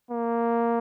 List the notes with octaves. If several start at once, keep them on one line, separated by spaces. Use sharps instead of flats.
A#3